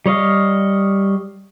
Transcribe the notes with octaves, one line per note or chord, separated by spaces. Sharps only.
G3 C#5 D#5 F5